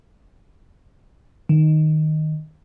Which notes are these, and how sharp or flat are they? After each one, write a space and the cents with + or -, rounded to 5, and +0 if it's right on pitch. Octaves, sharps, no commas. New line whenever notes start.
D#3 -5